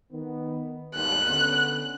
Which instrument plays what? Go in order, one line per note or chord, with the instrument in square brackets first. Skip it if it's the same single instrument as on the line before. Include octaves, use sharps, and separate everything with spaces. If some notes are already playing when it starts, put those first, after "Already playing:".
[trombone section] D#3 B3
[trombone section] G#1 D#2 G3 [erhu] F#6
[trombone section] D3 B3 C#4